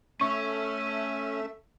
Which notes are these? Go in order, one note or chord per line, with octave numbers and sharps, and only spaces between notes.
A3 C#4 E5 C#6